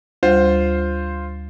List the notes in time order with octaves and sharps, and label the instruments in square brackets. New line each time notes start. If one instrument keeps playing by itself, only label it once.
[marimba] D2 G3 [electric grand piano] F4 C5